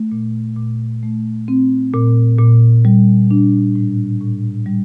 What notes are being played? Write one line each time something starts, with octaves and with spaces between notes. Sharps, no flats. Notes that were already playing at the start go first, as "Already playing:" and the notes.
Already playing: A3
A#2
A#2
A3
C4
A#2
A#2
G3
D4
A2
A2
G3